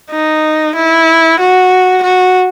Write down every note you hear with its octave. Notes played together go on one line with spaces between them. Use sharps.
D#4
E4
F#4
F#4